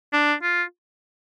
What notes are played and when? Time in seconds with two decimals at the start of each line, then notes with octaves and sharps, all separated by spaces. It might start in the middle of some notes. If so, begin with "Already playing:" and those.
0.13 D4
0.43 F4